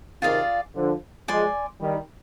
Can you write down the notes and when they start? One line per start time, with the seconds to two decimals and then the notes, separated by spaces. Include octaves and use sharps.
0.22 C3 D#3 F4 G#4 D5 F5
0.75 D3 F3
1.28 F3 G#3 D5 G#5 C6
1.80 D#3 G3